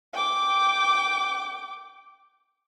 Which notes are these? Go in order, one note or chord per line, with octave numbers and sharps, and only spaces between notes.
G5 D6